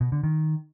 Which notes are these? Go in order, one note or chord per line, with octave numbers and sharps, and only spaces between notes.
B2
D3
D#3